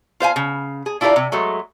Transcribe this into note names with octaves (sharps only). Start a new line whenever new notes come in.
F4 C5 F5 G#5
C#3
G#4
D4 E4 F4 G4 A#4 D5
C3
F#3 G#3 A3